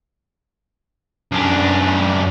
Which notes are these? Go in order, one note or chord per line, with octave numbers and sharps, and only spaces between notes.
F#2 D4